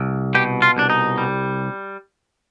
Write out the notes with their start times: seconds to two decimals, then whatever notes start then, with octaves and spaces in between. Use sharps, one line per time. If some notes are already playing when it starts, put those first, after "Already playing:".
Already playing: C2
0.35 B2 G4
0.62 F4
0.77 C2 D4
0.90 D#4
1.18 G3